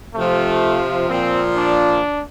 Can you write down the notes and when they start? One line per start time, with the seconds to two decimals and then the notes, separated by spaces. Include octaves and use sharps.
0.15 C3 F3 A3
1.09 A#2 F3 C4
1.56 D4